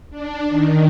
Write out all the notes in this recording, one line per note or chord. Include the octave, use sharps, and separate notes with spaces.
D4
D#3